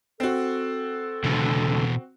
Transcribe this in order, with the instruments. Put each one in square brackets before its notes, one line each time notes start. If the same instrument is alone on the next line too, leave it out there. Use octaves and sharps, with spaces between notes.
[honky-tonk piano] C4 F#4 [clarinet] A4
[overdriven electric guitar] C#2 D3 [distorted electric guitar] B2 E3